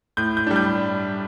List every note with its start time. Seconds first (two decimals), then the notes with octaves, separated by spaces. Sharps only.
0.17 A2 G6
0.37 G6
0.47 G3 D4
0.56 G6